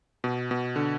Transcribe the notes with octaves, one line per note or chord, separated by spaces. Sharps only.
B2
B2
D3